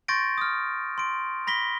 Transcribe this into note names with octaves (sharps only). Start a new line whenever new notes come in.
C6 C#6 G6 A6 A#6 D7
D#6 F6
C6 D7
B5 A#6 B6 G7